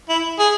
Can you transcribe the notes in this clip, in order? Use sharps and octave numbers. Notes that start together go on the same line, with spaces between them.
E4
G#4